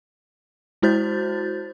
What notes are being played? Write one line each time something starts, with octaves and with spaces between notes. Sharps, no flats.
G#3 E4 F#4 C5 G6 A6